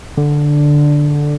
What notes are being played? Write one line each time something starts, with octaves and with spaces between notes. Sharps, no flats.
D3